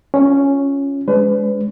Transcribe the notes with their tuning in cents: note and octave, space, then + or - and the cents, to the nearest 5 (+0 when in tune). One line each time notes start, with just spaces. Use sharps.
C#4 +0 F4 +0
G#3 +0 D4 -45 B4 +40